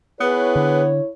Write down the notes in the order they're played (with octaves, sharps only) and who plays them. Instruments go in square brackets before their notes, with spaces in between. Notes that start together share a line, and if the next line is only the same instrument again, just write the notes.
[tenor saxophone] B3 [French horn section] E4 C#5 [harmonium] G#4 B4
[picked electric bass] D3